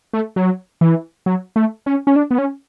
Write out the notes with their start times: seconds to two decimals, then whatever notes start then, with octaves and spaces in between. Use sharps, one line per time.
0.13 A3
0.36 F#3
0.81 E3
1.26 F#3
1.56 A3
1.86 C#4
2.07 C#4
2.16 D4
2.31 B3
2.38 C#4